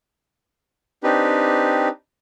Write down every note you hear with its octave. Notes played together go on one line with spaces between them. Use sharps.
C4 D4 D#4 G4 B4